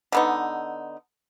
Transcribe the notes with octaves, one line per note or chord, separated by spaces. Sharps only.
D3 B3 D#4